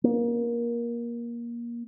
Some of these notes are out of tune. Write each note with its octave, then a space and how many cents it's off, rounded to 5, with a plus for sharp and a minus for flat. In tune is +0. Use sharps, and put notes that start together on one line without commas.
A#3 +20